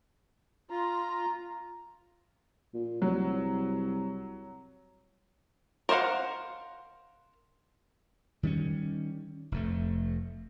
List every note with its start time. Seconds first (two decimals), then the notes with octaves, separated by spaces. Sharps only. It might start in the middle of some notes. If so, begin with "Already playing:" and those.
0.70 F4 A#5
2.74 A#2
3.02 C2 F#3
5.89 A#4 C5 D5 F5 F#5
8.43 D#3 G3 C4 C#4
9.52 F1 F2 A3